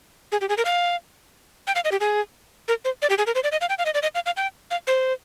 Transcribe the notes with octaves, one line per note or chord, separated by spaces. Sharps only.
G#4
G4
G#4
A#4
F5
G5
F5
D#5
G4
G#4
A#4
C5
D5
G4
G#4
A#4
C5
D5
D#5
F5
G5
F5
D#5
D5
D#5
F5
F5
G5
F5
C5